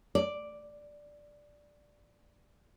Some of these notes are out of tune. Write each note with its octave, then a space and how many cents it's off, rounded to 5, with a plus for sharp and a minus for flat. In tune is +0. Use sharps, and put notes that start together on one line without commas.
D5 +0